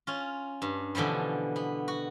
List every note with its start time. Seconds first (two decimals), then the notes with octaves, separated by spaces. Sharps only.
0.07 C#4 F4
0.62 G2
0.95 B2 D3 E3 F3 G3
1.56 B3
1.88 F#4